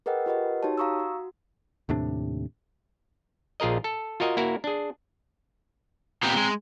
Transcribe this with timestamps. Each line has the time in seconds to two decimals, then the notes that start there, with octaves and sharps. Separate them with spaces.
0.06 G#4 A#4 B4 D#5 F#5 G5
0.26 F4 G4 A#4 B4 D#5 F#5
0.63 D#4 F#4 G4 C#5 A5
0.78 F#4 F5 A#5 C#6 D#6 E6
1.00 F#4
1.89 D#2 A2 C3 D4
3.60 A#1 F4 G#4 A#4 D#5
3.84 A4
4.20 F4 F#4 A#4 D#5 G#5
4.37 A#3 E4 F#4 A#4
4.64 D4 G#4
6.23 A#2 B3 C4 G4 A#5
6.37 G#3